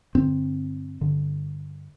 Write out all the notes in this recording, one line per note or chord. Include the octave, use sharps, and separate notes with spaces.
G2 D3 C4
G2 D3